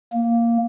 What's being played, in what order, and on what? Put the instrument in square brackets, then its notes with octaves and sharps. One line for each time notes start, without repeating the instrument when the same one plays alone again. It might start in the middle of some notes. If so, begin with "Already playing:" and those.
[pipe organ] A#3